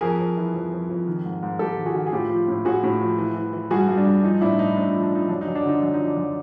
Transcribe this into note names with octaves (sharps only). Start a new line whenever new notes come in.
F2 G#4 A#4
F2
E3
F2
F2
F2
D#3
G#2
G#2
G#2 G4 A4
D#3
F#4 G#4
D#3
G#4
A2 F4 G4
F3
A2
A2 F#4 G#4
A2
F3
E3
E3
E3
G2 F#4 G#4
G2
D4
G2
F3 D#4
A2 D4 E4
A2 D#4
A2 D4
D#4
F3
D4
F3 D#4
F#2 D4
D#4
F#2
D4
D3 D#4
F#2 D4
D#4
F3
D4
F#2